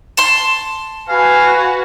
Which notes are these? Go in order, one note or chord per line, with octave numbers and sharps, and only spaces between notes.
A5 C6
F#4 B4 F5 G#5